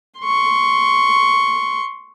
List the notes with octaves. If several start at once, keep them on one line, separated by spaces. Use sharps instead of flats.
C6 C#6